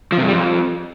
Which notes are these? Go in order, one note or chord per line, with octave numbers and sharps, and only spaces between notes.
F3
C3
G2
G3
F2